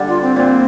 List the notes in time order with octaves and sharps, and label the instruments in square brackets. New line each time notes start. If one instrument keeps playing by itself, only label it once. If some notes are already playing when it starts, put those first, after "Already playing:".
Already playing: [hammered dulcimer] D3 G3
[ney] F4
C4
[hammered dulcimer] A#2 [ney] C4